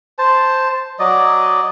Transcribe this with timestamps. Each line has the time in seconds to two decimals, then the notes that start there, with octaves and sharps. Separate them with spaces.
0.19 C5 A5
0.99 F#3 D5 D#5